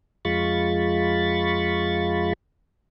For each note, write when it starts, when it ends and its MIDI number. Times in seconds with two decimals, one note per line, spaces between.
0.25 2.33 41
0.25 2.33 56
0.25 2.33 65
0.25 2.33 83
0.25 2.33 85
0.25 2.33 93